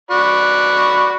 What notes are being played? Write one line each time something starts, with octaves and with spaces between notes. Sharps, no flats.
F#4 D5 B5